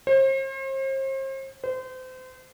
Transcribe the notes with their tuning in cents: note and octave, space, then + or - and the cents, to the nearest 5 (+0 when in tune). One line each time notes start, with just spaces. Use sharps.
C5 +40
C5 -30